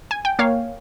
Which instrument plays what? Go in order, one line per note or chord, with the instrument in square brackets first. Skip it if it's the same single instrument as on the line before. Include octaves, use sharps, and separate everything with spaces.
[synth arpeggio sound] G#5
G5
A#3 C#5 F5